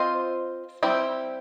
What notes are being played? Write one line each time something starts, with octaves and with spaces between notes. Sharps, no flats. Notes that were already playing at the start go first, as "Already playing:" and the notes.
Already playing: C4 F4 C5 D#5
G3 C4 E4 G4